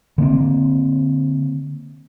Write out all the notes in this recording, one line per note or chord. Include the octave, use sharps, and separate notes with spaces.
D3 A#3 C4